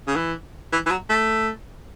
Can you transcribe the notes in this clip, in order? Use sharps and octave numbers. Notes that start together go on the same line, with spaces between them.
C#3
E3
E3
E3
F#3
A3